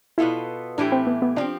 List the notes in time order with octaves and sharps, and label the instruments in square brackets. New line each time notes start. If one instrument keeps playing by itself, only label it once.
[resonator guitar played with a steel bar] B2 B3 F4 A4 [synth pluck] E4
[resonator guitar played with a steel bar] A2 E3 A3 E4 G4 [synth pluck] D4
[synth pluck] C4
B3
B3
[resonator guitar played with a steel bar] F3 C4 G4 [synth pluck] D4